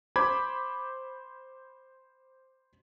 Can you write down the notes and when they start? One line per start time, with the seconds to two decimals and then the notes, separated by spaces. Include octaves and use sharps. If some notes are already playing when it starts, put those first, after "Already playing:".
0.16 C5 B5 D6 G#6